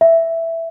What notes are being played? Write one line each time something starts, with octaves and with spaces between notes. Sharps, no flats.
E5